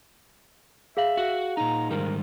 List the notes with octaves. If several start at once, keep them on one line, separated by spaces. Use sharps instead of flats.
G#4 E5 F5 F#7
F#4
A#2 D#4 A#5
G#2 D#3 G3 A#4